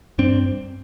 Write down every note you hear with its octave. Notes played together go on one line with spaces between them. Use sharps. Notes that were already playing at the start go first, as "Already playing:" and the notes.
G2 C4 D4